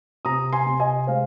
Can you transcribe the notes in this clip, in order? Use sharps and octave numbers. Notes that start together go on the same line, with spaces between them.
C3 A#5 D#6
G#5 C6
C3
D#5 G#5
G#3 C5 F5